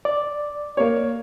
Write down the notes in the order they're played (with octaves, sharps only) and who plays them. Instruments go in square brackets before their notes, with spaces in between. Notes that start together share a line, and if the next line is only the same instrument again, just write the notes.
[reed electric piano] D5
[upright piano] A#3 C#5